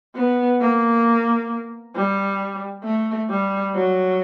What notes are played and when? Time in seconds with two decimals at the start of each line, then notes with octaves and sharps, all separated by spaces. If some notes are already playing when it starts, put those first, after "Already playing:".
0.15 B3
0.61 A#3
1.95 G3
2.84 A3
3.29 G3
3.75 F#3